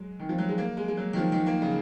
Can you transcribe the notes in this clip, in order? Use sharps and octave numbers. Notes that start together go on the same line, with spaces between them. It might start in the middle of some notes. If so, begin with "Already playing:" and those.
Already playing: F#3 G#3
D#3
F3
F#3
G#3
A#3
G#3
G#3
F#3
D#3
F3
D#3
A#3
C#3